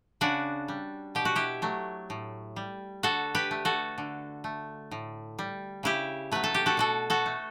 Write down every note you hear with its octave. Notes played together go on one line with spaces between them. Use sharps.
C#3 D4 F#4
G3
B2 G4
F#4
E4 G4
F#3 A3
A2
G3
D3 F#4 A4
G4 B4
A3
F#4 A4
D3
A3
A2
G3
C#3 E4 G4
F#3 A3 B4
A4
G4
F#4 A4
B2 F#4 A4
F#4 A4
A3